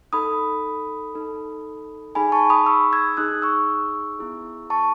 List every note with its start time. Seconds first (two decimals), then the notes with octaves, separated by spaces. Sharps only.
0.13 D#4 A4 B5 D#6
1.15 D#4 A4
2.15 D#4 G#4 G#5 B5
2.32 A5 C#6
2.50 B5 D#6
2.66 C#6 E6
2.93 E6 G#6
3.17 D#4 G#4 D#6 F#6
3.42 C#6 E6
4.19 B3 E4 G#4
4.70 A5 C#6